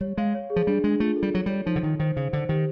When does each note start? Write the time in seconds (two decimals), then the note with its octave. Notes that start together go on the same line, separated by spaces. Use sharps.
0.01 G3 C#5
0.18 G#3 F5
0.34 C#5
0.50 G#4
0.56 F3
0.67 G3 D4
0.84 G#3 D4
1.00 A3 F4
1.16 A4
1.23 G3
1.34 F#3 C#5
1.46 G3 C#5
1.66 F3 D#4
1.76 D3
1.83 D#3 D#4
1.99 D#3 C5
2.16 C#3 C5
2.33 D3 C5
2.49 D#3 G4